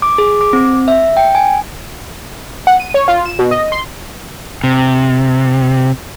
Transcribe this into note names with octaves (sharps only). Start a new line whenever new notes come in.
D6
G#4
D6
C4
E5
G5
G#5
F#5
D#7
C#5
F4
E7
B2
D#5
C6
C3